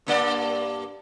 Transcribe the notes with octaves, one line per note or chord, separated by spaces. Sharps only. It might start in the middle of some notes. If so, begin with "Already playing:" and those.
G2 A#3 D5